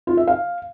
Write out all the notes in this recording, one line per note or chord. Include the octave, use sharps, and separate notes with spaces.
F4
E5
F5